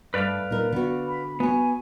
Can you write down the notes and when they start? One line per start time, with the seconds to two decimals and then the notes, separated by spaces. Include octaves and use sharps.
0.14 G2 A3 B4 D5 F5
0.50 A#2 D#4 A#4
0.72 D3 B3 F#4
1.07 B5
1.40 B3 F#4 C#5 G#5